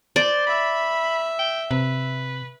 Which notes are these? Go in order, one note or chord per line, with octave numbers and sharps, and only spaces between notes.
C5 D5
E5 B5
G5
C3 B4